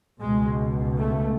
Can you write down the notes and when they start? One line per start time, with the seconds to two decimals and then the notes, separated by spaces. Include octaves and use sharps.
0.20 C#2 B2 G#3
0.98 A3